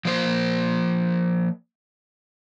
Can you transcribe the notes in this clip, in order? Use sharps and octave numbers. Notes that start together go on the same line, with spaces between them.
F3 A#3 C5